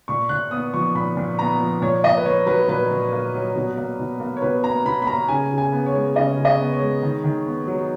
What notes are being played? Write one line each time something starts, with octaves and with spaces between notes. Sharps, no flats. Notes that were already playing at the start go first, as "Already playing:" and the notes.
A#2 C#6
A#2 F#6
B3 D#6
F3 C#6
A#2 B5
A#2
B3 A#5
F3
A#2 C#5
A#2 D#5
B4
A#3 C#5
F#3 B4
A#2 B4
A#2
A#3
F#3
B2
A#3
B2
A#3
C#5
B2 B4
A#3 A#5
B2 B5
B5
A#3 A#5
C#3 G#5
C#3
G#5
B3
C#5
G#3
C#3 D#5
C#3
D#5
B3
C#5
G#3
D#3
D#3
B3
F#3